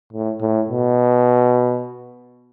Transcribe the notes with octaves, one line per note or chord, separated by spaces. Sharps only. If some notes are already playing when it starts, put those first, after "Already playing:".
A2
A2
B2